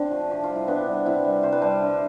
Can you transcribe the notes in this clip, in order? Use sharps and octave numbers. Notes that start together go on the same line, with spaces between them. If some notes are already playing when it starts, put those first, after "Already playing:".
Already playing: D3 C4 D4
F3 A3
C3 G4
F4
G3
E4
C3 B3 D4
G3
C3 C4 E4
G3
C3 C5
B4
G3 A4 C5
D3